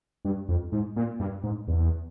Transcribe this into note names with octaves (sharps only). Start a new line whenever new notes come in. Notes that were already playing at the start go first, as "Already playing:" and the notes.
G2
F2
G#2
A#2
G2
G#2
E2